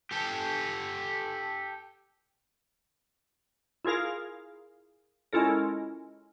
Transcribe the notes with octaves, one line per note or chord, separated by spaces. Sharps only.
G4 A4
E4 F4 G#4 A#4 F5
G#3 C#4 E4 F4 A4 A#4